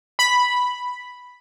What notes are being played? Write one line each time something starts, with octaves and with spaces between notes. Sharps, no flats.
B5